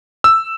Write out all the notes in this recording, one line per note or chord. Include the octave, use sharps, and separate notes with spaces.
E6